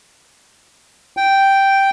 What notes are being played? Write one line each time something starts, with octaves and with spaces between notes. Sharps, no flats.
G5